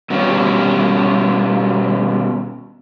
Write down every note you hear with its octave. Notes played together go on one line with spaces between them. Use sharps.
B2 G3 A#3 C#4